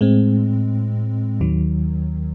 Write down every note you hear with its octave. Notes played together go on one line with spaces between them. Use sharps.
A2 G#3 C4
D#2 D#3 F#3